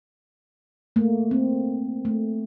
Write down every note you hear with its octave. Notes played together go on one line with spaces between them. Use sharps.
A3 A#3
C4
A3